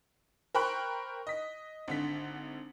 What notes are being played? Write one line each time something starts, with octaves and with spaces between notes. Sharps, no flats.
A#4 C5 G5 B5 C#6 F#6
D#5 B6
G#1 D3 B6